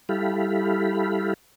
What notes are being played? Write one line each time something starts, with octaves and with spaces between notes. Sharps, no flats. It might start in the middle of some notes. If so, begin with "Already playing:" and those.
G3 E4 G4 A4 F5 B5